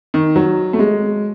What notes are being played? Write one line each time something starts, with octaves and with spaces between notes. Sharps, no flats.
D#3
F#3
A3
G#3